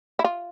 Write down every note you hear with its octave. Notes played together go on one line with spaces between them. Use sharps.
E4
F4